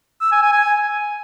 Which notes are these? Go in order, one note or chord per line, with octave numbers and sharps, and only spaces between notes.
E6
G#5
G#5
G#5